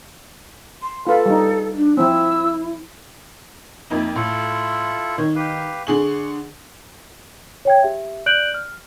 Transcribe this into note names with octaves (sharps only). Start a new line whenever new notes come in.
C6
F4 A4 B4
G3 D#4
D4
F3 C4 E4 E6
F2 A#3 D#4 E4
A2 E4 F4 A4
D#3 C#5
G4 B4 F5
D3 G#4 C#6 F#7
C#5 G5 G#6
G4 E5
D5 F#6 G6 D7 F#7
F6